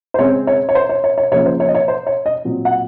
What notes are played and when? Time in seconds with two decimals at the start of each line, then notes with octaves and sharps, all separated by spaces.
0.14 C5
0.19 C#3 G#3 C4 C#5
0.47 C#5
0.69 C#5
0.75 C5
0.89 C#5
1.04 C#5
1.18 C#5
1.32 C#3 F3 A#3 C#5
1.46 C5
1.60 C#5
1.69 D#5
1.75 C#5
1.88 C5
2.07 C#5
2.26 D#5
2.45 A#2 F#3 C4
2.65 F#5